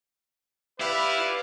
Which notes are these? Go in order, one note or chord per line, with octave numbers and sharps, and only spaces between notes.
E4 G4 B4 D5 F5